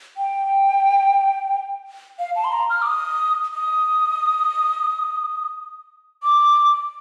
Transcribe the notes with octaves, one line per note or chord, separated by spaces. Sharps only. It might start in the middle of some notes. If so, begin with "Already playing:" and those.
G5
F5
A5
C6
A#5
F6
D6
D#6
D#6
D6